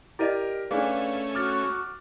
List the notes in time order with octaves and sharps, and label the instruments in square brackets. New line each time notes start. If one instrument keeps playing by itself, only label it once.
[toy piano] E4 D5 D#5 [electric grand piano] G4 A#4 D#7
[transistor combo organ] A3 C#4 [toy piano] D4 G#4 [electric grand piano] B4 D5 F5
[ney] F#4 [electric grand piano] D6 F6 A6